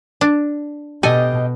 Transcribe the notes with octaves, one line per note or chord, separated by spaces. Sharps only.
D4
B2 G4 A4 D#5 G#5